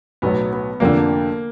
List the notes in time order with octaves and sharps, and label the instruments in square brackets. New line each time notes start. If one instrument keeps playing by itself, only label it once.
[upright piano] B1 A2 F#3 [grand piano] B3
[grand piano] B3
[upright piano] F1 F2 D3 [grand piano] A#3